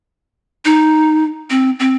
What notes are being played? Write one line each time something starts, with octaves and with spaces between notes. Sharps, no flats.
D#4
C4
C4